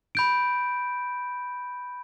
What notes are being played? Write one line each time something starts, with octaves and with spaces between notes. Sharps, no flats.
B5 G6 D7